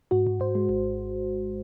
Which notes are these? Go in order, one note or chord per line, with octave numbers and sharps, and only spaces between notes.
G#2 F#4
G#2
G#2 C5
G#3
G#1